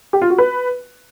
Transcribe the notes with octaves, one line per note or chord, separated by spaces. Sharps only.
G4
F4
F#4
B4